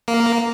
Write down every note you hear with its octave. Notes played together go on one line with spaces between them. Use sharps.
A#3